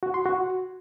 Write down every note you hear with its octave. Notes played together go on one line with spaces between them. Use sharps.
F#4
C6
F#4